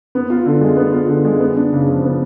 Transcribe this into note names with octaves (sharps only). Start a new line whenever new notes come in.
B3
F4
D3
G#3
B3
F4
D3
G#3
B3
D4
C#3
F3
B3